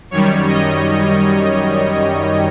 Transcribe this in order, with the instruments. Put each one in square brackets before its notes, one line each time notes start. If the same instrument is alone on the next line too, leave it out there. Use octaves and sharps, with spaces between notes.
[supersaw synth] F#2 D#3 G3 C#5
D#5